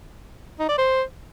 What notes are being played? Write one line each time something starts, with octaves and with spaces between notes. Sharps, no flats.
D#4
D5
C5